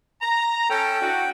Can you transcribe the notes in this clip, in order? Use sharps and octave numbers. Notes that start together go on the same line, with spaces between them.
A#5
C#4 A4 G5
D4 E4 F#4